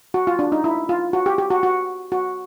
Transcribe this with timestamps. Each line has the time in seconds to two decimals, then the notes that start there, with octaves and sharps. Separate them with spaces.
0.14 F#4
0.27 F4
0.39 D4
0.52 D#4
0.64 E4
0.89 F4
1.13 F#4
1.26 G4
1.38 G4
1.50 F#4
1.63 F#4
2.12 F#4